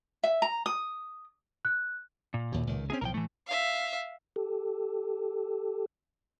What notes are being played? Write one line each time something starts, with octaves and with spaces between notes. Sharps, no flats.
E5
A#5
D#6
F#6
A#2
D#2 B2
C#2 D#3
A#3 C4 C#4 D#4 G#4
B1 A2 F3 A#4 G5
A2 E3 A3
E5 F5
G4 A4